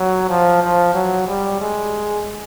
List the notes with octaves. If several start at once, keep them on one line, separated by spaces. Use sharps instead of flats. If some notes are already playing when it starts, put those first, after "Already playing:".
Already playing: F#3
F3
F3
F#3
G3
G#3